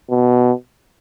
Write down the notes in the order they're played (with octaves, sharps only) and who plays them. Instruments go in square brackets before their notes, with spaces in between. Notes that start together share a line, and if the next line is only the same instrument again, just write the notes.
[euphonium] B2